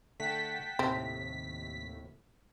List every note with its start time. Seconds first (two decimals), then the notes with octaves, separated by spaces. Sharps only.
0.20 D3 A3 F#5 G5 A5 B6
0.79 D#2 A2 C3 C4 A5